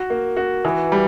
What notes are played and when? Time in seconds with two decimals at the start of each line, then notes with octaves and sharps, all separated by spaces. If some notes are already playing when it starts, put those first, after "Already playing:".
Already playing: F#4
0.10 A#3
0.37 F#4
0.65 E3
0.92 G3